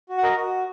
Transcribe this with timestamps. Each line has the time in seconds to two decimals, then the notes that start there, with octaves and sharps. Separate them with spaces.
0.09 F#4
0.18 F#5
0.23 A#4 D#5
0.37 F#4